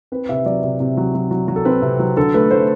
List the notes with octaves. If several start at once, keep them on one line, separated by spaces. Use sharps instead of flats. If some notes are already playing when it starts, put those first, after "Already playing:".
C4 B4
C3 E5
F#3 D5
C3
C3
F#3
F#3
F#3
F#3
A4
C4 B4
C3
F#3
D3 A4
A3 B4
A3 C5